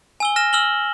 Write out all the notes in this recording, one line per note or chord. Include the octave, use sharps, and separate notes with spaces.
G#5 E6 G7
F6 A#6 E7
E6 F6 F#7 G7